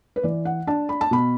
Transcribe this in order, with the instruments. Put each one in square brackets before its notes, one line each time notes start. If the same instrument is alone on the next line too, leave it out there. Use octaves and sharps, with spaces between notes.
[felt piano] B4
E3 D5
F#5
D4 A5
B5
A5
B2 B5